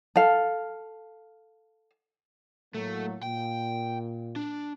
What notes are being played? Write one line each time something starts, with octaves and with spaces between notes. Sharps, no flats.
A4 F5
A2 F#3 A3 A#3
A#2 G5
D4